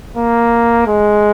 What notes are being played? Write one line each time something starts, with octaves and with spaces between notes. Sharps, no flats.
A#3
G#3